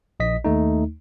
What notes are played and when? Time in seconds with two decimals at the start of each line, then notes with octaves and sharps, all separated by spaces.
0.20 A#1 D#5 B6
0.44 D#2 A3 D#4